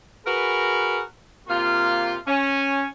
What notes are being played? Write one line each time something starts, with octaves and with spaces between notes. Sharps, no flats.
F#4 G#4 A#4 B4
C3 A#3 F4
C#4